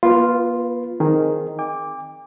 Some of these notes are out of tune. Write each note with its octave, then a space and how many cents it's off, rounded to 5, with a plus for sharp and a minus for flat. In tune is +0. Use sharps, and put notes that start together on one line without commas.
A#3 +45 F4 +0 B4 +0
D#3 +0 C4 +0 G#4 +0
G5 +45 D6 +0